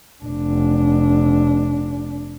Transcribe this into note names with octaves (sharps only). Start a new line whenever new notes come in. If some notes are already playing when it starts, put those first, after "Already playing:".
F1 D4